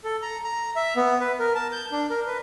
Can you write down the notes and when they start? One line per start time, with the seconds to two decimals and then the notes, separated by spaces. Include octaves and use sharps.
0.04 A4
0.22 A#5
0.44 A#5
0.76 E5
0.96 B3
1.21 B4
1.39 A#4
1.55 A5
1.72 G6
1.92 D4
2.10 A#4
2.27 B4